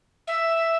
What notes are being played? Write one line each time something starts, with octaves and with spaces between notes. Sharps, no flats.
E5